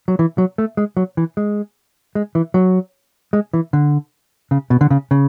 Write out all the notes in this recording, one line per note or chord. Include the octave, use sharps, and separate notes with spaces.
F#3
E3
F#3
A3
G#3
F#3
E3
G#3
G#3
E3
F#3
G#3
E3
D3
C#3
B2
D3
C#3
C#3